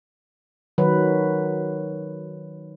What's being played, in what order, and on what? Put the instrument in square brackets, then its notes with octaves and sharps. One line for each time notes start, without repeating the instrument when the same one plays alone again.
[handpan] D#3 F#3 B4